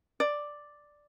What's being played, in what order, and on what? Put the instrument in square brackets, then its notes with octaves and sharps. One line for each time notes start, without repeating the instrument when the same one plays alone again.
[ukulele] D5